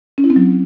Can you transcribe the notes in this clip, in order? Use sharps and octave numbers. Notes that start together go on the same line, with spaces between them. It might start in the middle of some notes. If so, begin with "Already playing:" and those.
C#4
E4
C4
F#3